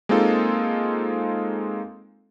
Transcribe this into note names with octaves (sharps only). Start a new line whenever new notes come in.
G#3 A#3 C4 D#4 F4 A4